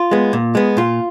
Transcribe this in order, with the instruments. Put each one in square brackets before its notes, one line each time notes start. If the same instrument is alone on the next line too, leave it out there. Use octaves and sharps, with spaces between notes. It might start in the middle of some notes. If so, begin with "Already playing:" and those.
Already playing: [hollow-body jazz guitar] F4
G#3 B3
A#2
G#3 B3
A#2 F4